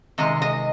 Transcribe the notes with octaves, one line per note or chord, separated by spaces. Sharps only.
C3 D#3 G#3 D#5
D#5